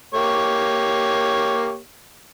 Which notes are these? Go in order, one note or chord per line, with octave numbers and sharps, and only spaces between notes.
A#3 G4 C#5